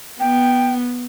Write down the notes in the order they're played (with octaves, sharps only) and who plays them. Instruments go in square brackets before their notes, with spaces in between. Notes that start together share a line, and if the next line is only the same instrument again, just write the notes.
[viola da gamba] B3 [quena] G5